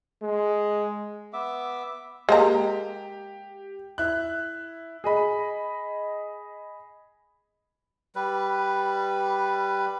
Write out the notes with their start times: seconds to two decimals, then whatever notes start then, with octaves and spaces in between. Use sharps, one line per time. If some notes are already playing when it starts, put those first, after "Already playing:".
0.23 G#3
1.33 B3 E5 D6
2.29 G#3 A#3 G4 A#5
3.98 E4 F#6
5.04 G#4 D#5 B5
8.15 G3 B4